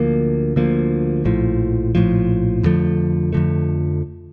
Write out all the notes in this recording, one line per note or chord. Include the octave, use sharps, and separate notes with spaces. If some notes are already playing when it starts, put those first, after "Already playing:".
Already playing: D2 D3 F3 A#3
D2 D3 F3 A#3
A#1 A2 F3
A#1 A2 F3
F2 D3 F3 A3
F2 D3 F3 A3